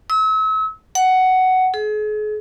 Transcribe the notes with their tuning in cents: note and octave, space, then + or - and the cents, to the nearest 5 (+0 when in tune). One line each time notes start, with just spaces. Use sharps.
E6 -40
F#5 +10
G#4 +40